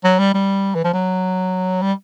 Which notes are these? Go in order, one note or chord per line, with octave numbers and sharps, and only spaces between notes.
F#3
G3
G3
E3
F3
F#3
G3